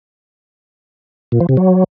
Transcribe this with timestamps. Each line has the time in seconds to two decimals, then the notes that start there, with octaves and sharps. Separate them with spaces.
1.32 A#2
1.40 F3
1.49 C3
1.57 F#3